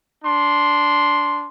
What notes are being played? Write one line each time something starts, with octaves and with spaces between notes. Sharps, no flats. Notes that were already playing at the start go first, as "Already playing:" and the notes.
D4 C6